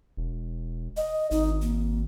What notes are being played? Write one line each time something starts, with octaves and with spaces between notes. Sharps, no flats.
E1
D#5
G#1 D#4
A#3